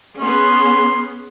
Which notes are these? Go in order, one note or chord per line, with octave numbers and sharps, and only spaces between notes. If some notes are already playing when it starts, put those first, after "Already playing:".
B3 C#4 G#4 C6